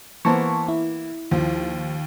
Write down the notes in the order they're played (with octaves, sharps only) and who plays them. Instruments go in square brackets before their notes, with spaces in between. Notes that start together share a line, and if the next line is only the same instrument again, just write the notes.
[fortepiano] E3 A#3 B3 [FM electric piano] C5 A5 C#6
[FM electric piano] E4
[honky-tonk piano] D#2 [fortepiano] F3